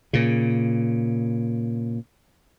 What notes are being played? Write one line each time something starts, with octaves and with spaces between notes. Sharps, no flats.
A#2 C#3